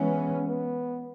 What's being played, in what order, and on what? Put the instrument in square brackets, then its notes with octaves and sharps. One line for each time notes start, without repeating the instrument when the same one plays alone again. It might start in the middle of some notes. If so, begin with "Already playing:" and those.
Already playing: [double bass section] E3 G#3 C#4 [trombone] B3
[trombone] B3